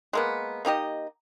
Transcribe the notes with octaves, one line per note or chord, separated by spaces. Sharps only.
G#3 A#3 B3
A#3 D#4 G4 D#5